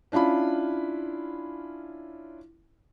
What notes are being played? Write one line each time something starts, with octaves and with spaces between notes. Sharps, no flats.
C#4 D4 E4 F4 B5